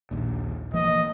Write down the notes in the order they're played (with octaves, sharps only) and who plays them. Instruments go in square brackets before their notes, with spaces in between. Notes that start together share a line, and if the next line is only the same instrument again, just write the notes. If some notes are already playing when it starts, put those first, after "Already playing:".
[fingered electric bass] A#1 D#2 A#2
[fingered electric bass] E3 F3 A#3 [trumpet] D#5